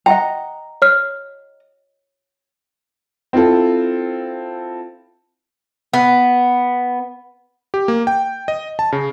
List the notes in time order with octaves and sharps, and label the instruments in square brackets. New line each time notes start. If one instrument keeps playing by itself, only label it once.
[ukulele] D#5 F#5 A#5 [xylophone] G5
[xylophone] C#5 F6
[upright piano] C4 E4 F4 A4
[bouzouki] B3
[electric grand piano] G4
A#3
G5
D#5
A5
C#3